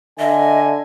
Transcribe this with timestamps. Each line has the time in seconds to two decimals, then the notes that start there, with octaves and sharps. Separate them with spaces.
0.19 D3 D#5 E5 G#5